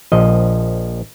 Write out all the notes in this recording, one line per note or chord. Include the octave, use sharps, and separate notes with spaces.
A#1 F3 D#5